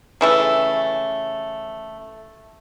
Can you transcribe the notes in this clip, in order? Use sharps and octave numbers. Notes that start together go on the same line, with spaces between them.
C#3 E3 A3